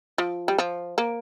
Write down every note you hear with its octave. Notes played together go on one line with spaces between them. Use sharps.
F3
G3
F3
A#3